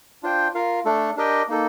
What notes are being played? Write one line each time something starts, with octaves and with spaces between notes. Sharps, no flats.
D4 F4 C5 G5
F4 A#4 F5
A3 D4 A4
D4 G4 A#4 D#5 G5
A#3 D#4 A4